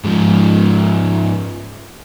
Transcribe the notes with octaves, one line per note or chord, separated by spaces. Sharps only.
G#2 F3